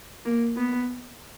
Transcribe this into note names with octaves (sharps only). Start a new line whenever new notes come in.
A#3
B3